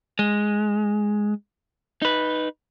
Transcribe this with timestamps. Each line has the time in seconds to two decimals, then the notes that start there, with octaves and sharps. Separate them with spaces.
0.19 G#3
2.02 D#4 B4